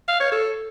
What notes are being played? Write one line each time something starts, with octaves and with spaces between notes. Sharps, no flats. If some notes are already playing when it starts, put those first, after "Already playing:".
F5
C#5
A4